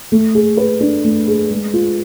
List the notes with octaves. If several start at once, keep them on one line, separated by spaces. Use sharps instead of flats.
A3
G#4
B4
D4
A3
G#4
G#3
F4